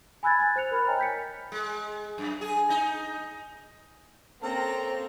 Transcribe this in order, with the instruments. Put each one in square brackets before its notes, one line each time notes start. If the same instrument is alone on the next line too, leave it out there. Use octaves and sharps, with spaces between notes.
[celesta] G#5 B5 E6 F#6 G#6 A6
A6
C5 F#6 C#7 F7
A#4 B5 F6
C#5 D#5 G5 G#5 A#5
G6 B6 C#7
[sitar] G#3
F#2
G#4
D#4
[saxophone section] A#3 C#4 A4 [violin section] C4 [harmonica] A#5